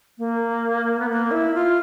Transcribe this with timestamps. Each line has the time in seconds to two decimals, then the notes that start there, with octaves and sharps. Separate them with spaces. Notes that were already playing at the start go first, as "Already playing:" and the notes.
0.18 A#3
0.99 B3
1.09 A#3
1.31 E4
1.54 F4